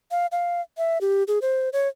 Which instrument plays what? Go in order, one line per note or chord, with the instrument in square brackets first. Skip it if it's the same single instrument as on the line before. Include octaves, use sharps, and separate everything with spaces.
[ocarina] F5
F5
E5
G4
G#4
C5
C#5